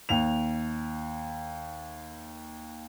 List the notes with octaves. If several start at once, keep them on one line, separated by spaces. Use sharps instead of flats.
D#2 F7